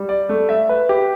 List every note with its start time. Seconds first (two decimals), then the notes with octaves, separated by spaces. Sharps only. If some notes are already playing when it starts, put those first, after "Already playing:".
Already playing: G3
0.09 D5
0.29 A3
0.49 E5
0.69 B4
0.89 G4